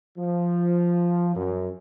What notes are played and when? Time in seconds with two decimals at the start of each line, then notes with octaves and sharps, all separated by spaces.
0.18 F3
1.35 F#2